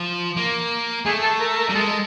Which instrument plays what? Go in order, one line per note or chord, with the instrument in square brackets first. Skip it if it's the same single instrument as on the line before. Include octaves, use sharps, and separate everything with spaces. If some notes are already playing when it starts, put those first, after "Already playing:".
Already playing: [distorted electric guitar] F3
A#3
[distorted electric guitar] A3 [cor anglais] G#4
[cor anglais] A4
A#4
A#4
[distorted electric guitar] G3
[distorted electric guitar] G#3 [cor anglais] A4